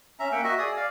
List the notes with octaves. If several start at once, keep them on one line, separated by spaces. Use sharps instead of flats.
C#4 E5 A#5
A#3 E5 F#5 G5
F#4 D#5 E5
G#4 D5 D#6
D5 F5